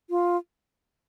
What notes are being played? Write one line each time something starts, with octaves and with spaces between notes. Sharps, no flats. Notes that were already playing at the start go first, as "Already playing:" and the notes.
F4